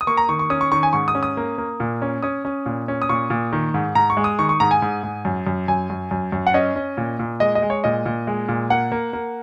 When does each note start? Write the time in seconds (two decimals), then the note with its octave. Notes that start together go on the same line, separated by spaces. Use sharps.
0.01 D#6
0.07 A#3 C#6
0.17 A#5
0.29 D#3 C#6
0.39 C#6
0.50 C#4 D#6
0.61 C#6
0.72 D#3 C#6
0.83 G#5
0.93 G#2 C#6
1.08 D#6
1.15 C#4
1.23 D#6
1.37 A#3
1.58 A#3
1.80 A#2
2.02 C#4
2.23 C#4 D#6
2.45 C#4
2.66 A#2
2.88 C#4
3.02 D#6
3.09 A#2 C#6
3.30 A#2
3.53 D#3
3.74 G#2
3.95 G#2 A#5
4.10 C#6
4.17 G#3
4.24 D#6
4.39 D#3 C#6
4.49 C#6
4.60 G#2 A#5
4.71 G#5
4.82 G#2
5.03 G#2
5.25 F#2
5.47 F#2
5.68 F#2 G#5
5.90 F#2
6.11 F#2
6.32 F#2
6.47 F#5
6.54 C#4 D#5
6.76 C#4
6.97 A#2
7.19 A#2
7.40 G#3 D#5
7.55 D#5
7.62 G#3
7.70 C#5
7.84 A#2 D#5
8.06 A#2
8.27 G#3
8.49 A#2
8.70 A#3 F#5
8.92 A#3
9.13 A#3